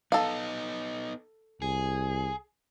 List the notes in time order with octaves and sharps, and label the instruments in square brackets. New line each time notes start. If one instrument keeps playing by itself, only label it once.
[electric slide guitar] B3 D#4 [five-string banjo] A4 F5
[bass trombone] C2 [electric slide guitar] G#4